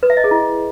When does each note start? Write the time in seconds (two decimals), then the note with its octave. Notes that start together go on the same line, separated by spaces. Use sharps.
0.03 B4
0.10 E5
0.17 D#5
0.24 G#4
0.31 E4